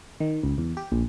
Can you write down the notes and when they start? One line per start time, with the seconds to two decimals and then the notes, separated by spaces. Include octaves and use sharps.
0.20 D#3
0.43 C#2
0.58 E2
0.77 G4
0.92 A#1